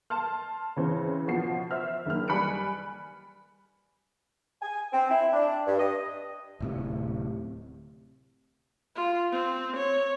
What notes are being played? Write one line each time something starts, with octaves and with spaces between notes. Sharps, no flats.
A5 C6 F6
C#3 E3 C4
B2 F3 C7
C5 E5 F6
F#1 D#3 A#3 F6
G3 G#5 B5 F#6 C#7 D7
G#5
C4
E4
D4
G2
D#5
D1 A2 C3
F4
C4
C#5